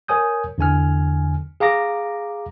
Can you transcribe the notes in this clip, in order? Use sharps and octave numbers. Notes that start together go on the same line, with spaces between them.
A#4 C#5 G#5 D#6 G6
E2 D3 G#5 F6
G#4 F5 A#5 D6 A#6